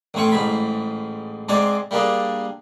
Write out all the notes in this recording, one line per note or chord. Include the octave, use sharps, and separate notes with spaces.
A1 A2 C4 G#5 C#6
A1 G#2 G#4 B5
G#2 G#3 C4 D5 G#5
G3 A#3 D4 G#4